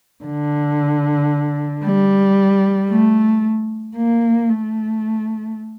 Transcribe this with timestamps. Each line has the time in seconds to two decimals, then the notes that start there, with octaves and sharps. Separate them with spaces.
0.25 D3
1.85 G3
2.90 A3
3.96 A#3
4.49 A3